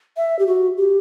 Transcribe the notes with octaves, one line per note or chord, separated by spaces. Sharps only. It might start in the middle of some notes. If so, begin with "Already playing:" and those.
E5
G4
F#4
G4